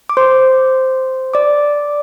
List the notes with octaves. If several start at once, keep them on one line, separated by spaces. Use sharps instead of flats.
D6
C5 C6
D5 D6